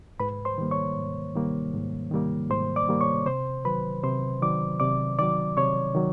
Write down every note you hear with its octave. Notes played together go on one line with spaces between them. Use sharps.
G#2 B4 B5
C5 C6
D#3 G3 A#3
C#5 C#6
G#2
D#3 G3 A#3
G#2
D#3 G3 A#3
G#2 C5 C6
D5 D6
D#3 G3 A#3
C#5 C#6
C3 C5 C6
D#3 F#3 B4 B5
C3 C5 C6
D#3 F#3 D5 D6
C3 D5 D6
D#3 F#3 D5 D6
C3 C#5 C#6
D#3 F#3